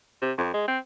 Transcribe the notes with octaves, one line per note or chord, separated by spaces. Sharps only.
C3
F2
G#3
C4